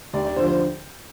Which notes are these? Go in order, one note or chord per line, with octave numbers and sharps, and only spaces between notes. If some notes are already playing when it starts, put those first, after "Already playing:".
D#2 D5
D5
D3 F3 C5
C5